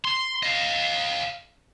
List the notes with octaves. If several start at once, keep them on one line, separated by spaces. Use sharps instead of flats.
C6
D#5 F5